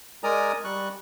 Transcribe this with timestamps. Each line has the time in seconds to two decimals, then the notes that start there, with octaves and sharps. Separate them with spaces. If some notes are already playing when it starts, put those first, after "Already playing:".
0.23 G#3 A#4 D5 G#5 A#5 D#6
0.64 G3 C#6 F#6